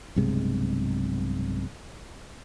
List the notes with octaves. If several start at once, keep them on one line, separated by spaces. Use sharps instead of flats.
B1 G2 C3 G#3